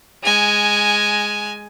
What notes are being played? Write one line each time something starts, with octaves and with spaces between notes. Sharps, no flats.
G#3 G#5